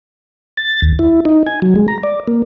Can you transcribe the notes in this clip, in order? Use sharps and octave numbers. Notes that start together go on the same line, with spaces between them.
A6
D#2
E4
D#4
G#5
F#3
G#3
A#5
D5
A#3